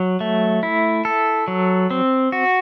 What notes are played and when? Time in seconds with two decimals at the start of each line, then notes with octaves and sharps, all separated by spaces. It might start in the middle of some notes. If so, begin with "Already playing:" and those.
Already playing: F#3
0.20 A3
0.63 E4
1.05 A4
1.48 F#3
1.91 C4
2.32 F#4